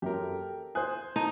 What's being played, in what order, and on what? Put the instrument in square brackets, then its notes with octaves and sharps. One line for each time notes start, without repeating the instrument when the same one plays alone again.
[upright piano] F#2 [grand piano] G4 A#4
[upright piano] A4
[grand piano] C5 G#5 [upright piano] D#6 F#6
[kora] D#4 [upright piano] A5